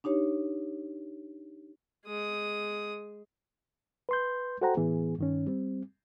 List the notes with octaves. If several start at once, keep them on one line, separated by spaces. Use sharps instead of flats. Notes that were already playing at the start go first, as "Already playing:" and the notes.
D4 D#4 G4 C#5
G#3 D#6
B4 C6 G6
F#4 A4 C5 F#5 G5 A#5
A2 E3 B3 G#4
G2 D#3 C#4
G3 C4